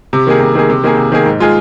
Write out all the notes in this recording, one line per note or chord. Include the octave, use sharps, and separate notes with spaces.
C3
D#3 A#3 G#4
C3
D#3 A#3 G#4
C3
D#3 A#3 G#4
C3
D#3 A#3 G#4
G#2
G#3 F4 G#4